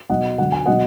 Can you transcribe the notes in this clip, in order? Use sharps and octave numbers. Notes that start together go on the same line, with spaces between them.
B2 F#3 D#5 F#5
D3 F#3 F#5
G#5
B2 F#3 D#5 F#5